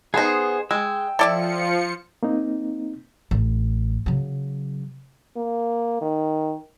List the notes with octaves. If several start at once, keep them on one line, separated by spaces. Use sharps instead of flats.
B3 D#4 G#4 C5
G#3 G5 E6
F3 E4 A4 D5 E5 C#7
A#3 C4 D#4
A1
C#3 F#3
A#3
D#3